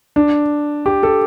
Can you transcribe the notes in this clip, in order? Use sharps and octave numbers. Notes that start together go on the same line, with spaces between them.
D4
G4
A4